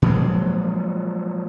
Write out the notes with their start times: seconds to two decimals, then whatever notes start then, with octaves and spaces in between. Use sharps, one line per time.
0.02 A#2 F3 F#3 G#3